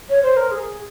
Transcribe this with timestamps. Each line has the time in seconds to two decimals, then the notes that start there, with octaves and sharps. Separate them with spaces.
0.09 C#5
0.22 C5
0.36 A#4
0.51 G#4